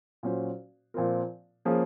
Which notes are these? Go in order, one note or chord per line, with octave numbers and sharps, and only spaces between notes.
A#2 F#3 C#4 F#4 C5
A#2 F3 C4 F4 A#4
F3 A#3 C#4 G#4